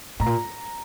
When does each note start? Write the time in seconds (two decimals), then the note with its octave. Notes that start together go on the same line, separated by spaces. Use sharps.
0.20 A2 A#5
0.26 A#2